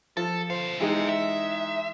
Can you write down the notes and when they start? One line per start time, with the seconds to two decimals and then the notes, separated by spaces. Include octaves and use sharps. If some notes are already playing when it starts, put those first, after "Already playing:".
0.17 F3 A4
0.50 B2 C5 F5
0.80 E3 G#3 D#4 E5 G5
1.09 E5